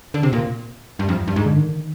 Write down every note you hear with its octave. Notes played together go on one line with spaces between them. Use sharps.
D3
C3
A#2
G2
F2
G2
G#2
D3
D#3